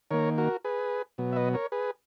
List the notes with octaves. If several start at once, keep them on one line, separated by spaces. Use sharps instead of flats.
D#3 A#3 A#4 C#5
F#4 A#4
G#4 B4
B2 F#3 B3
E5
B4 D#5
A#4 C#5
G#4 B4